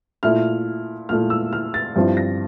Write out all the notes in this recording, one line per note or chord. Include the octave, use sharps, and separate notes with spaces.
A#2 A3 E4 F6
A#2 A3 E4 F6
E6
F6
A6
G2 F3 C4 E4
A#6